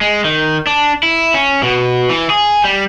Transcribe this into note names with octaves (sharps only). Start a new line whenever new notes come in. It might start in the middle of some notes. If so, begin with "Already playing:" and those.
G#3
D#3
D4
E4
C#4
B2
E3
G#4
G3